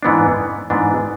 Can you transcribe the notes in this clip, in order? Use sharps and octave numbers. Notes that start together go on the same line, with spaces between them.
G#2 E3 B3 D4
G#2 E3 B3 D4